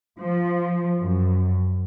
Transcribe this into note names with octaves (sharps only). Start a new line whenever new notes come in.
F3
F#2